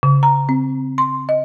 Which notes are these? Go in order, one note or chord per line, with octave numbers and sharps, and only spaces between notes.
C#3
A#5
C4
C6
D#5